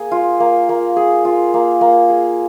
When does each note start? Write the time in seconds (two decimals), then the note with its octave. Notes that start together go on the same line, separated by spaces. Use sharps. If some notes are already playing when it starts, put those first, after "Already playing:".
Already playing: A#3 G#4
0.11 F4
0.40 A#3
0.69 A#3
0.96 G#4
1.25 F4
1.54 A#3
1.81 A#3
2.10 G#4